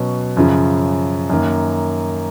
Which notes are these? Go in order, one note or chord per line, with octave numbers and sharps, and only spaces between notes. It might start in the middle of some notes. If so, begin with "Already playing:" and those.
Already playing: B2 F#3 C#4
F#2 C#3 F3
F#2 D#3 A#3